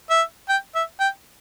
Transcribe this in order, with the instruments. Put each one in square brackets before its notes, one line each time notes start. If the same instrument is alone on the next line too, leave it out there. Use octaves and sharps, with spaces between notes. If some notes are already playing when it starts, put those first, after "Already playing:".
[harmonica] E5
G5
E5
G5